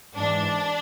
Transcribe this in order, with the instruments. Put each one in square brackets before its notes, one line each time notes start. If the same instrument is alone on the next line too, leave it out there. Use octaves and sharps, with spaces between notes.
[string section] G#2 E3 D4